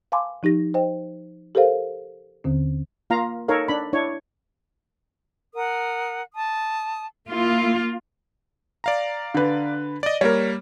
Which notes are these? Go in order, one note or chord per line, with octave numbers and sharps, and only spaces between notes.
F5 G#5 A5 B5 C6 D6
F3 D#4 G4 A#6
C5 D#5 G5
G4 A4 A#4 C5 F5
D#2 D3 C4
A#3 F4 F5 A#5
D#4 A4 A#4 C#5 F5
D4 B5
D4 E4 C#5
A#4 F#5 D#6
A5 D#6
A#3 E4 F4
D5 F5 A#5
D3 B4
D5 D#5
G3 A#3 A#4 C#5